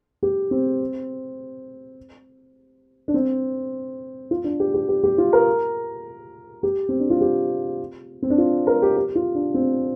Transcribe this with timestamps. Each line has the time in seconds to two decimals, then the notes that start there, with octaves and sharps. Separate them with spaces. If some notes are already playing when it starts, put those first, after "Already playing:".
0.23 G4
0.51 C4
3.08 D4
3.14 C4
4.31 F4
4.44 D4
4.60 G4
4.74 G4
4.88 G4
5.03 G4
5.18 F4
5.33 A#4
6.63 G4
6.89 C4
6.99 D4
7.10 F4
7.21 G4
8.22 C4
8.30 D4
8.38 F4
8.67 A#4
8.82 G4
8.96 G4
9.15 F4
9.35 D4
9.54 C4